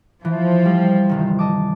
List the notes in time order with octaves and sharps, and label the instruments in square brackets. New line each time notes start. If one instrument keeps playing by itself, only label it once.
[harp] E3 [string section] F3
[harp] G3
G1 C3 D#3
D#5 A5 D6